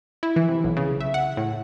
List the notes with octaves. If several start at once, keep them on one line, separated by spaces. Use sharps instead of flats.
E4
E3
C3
B1
C#3
E5
F#5
A2